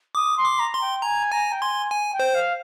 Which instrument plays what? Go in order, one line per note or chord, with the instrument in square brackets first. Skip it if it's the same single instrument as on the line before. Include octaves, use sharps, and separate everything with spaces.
[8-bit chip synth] D6 [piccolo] D#6
[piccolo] C6
[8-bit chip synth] D6
[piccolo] A#5
[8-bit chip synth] C6
[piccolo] G5
[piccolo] G#5 [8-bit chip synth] A#5
[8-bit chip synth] G#5 [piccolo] A#5
[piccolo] G5
[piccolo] G#5 [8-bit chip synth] C6
[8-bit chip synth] G#5
[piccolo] G5
[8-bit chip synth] C5
[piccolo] F5